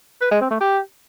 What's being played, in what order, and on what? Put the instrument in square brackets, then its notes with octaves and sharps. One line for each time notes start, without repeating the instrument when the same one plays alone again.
[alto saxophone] B4
G#3
C4
A3
G4